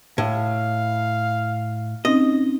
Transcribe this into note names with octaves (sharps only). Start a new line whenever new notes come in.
A2 F5
C4 C#4 D#4 D#5